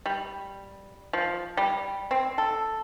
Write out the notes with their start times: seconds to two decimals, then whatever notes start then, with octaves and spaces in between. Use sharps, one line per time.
0.06 G3
1.13 F3
1.57 G3
2.11 C4
2.38 A4